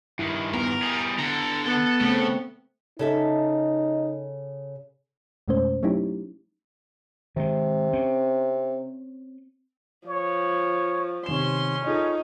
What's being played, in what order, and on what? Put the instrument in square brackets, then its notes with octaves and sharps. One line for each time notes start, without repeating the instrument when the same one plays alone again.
[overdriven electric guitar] G2 D#3 [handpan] E4
[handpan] B3 [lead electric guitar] A#4
[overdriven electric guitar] G3 G#4
[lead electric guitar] D3 [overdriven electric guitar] A4 A#5
[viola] B3 [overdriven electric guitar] A4
[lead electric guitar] C#3 [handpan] A3 C4
[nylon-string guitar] C#3 A4 E5 [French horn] D#4
[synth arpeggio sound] F2 B2 G#3 A3 C#4 C5
F#3 A3 C#4 D#4 E4 G4
[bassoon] C3 [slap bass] D#3 G#3
[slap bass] C4 C#4
[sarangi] F3 [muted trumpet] C#5
[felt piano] C3 D#3 E7 [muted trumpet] C#4 [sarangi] C6
[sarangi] D#4 [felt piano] F4 G#4 A4